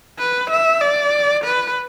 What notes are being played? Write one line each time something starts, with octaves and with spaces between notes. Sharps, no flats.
B4
E5
D5
B4